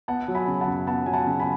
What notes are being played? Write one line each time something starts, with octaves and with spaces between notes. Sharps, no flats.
B3 F#5 A5
F#3
G#5 B5
C#3
F#5 A5
F#2
B3 F#5 A5
F#3 G#5
F#5 A5
C#3
G#5 B5